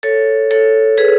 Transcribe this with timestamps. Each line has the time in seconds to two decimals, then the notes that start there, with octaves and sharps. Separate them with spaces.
0.03 A4 C#5
0.51 A4 C#5
0.98 G#4 B4